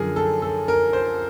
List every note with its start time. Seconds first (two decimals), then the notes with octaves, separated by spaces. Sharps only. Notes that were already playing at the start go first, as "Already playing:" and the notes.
Already playing: F#2 D3 F3 G#4 A#4
0.16 A4
0.42 A4
0.68 A#4
0.93 C5